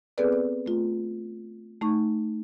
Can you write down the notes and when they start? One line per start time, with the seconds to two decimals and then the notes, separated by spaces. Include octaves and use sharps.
0.18 B3 C4 G#4 A4 B4 D5
0.33 D5
0.66 A3 F4
1.81 A3 D#4 C#6